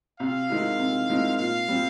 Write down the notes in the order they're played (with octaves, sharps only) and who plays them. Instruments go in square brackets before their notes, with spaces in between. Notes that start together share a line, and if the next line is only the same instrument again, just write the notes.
[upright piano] C3 [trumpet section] F5
[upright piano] D#3 G#3 C4 E4
C3
D#3 G#3 C4 E4
[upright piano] A#2 [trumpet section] F5
[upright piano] G3 C4